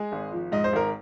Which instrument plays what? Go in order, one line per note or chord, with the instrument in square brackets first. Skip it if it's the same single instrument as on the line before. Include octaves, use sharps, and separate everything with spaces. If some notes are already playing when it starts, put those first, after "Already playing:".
Already playing: [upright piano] G#3 G#4
G#1
F3
G#2 D#5
C5
G#1 A#4